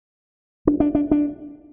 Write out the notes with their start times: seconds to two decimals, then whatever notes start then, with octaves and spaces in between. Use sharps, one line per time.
0.67 D4
0.80 D4
0.95 D4
1.11 D4